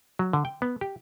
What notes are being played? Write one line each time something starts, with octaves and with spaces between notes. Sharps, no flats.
F#3
D3
G5
B3
G4